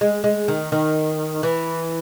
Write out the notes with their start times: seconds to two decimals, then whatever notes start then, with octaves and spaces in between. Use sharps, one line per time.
0.01 G#3
0.24 G#3
0.48 D#3
0.72 D#3
1.43 E3